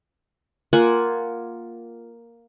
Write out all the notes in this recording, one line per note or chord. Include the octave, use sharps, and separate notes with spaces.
A#3 F4 F#5 G#5